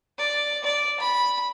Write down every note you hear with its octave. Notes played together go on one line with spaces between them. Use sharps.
D5
D5
B5